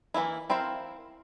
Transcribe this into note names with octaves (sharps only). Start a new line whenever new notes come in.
E3 F#3 A#3 E4
C4 E4 A#4 C5 F5